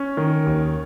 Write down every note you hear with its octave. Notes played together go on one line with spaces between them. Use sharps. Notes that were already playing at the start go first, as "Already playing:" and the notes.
Already playing: C#4
D#3
D#2